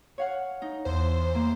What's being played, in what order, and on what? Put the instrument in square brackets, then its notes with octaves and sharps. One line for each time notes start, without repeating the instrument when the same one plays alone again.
[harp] C#5 F5 F#5
D#4
[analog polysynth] E2 C5
[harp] A#3